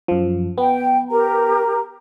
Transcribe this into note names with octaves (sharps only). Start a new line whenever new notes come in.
F#2 F3
B3 G5
G4 A#4 A#5